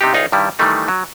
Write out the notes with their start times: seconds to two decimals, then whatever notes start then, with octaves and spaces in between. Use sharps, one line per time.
0.01 C3 D4 D#4 G4
0.14 C2 D#4 F4 G#4 C#5
0.32 G2 D#3 G3 E4
0.59 D#3 E3 G3 A3 D#4
0.88 F#3